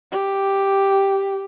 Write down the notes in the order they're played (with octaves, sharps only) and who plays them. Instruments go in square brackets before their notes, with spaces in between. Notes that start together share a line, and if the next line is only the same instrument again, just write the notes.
[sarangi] G4